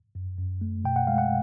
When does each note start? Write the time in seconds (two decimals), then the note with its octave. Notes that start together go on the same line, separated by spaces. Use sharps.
0.15 F#2
0.38 F#2
0.61 A3
0.84 B2 G5
0.96 F#5
1.07 G#3 F5
1.18 F#5